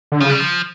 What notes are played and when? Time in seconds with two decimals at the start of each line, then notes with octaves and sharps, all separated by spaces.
0.12 D3
0.21 C#3 F3
0.30 G3
0.40 F3